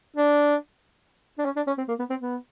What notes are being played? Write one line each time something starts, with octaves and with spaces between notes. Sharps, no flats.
D4
D4
C#4
D4
C#4
C4
A#3
B3
C4
B3